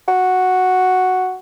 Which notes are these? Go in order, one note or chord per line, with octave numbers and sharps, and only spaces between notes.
F#4